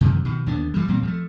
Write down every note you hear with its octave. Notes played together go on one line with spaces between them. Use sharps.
F#2 C3 D#3 E3
B2 D#3
D#2 D3 B3 D4
G2 E3 F#3 G3
E2 A#2 G3 C4
F3 G#3 A3